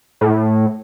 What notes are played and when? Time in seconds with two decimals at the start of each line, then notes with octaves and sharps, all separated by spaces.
0.21 A2